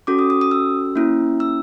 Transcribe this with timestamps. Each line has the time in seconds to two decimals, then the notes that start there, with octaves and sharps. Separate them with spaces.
0.07 C#4 F#4 A4 D6
0.19 D#6
0.30 D#6
0.41 D#6
0.51 E6
0.96 A#3 C#4 E4
1.40 E6